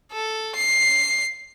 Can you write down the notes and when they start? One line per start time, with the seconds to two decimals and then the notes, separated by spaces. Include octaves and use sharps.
0.12 A4
0.55 C7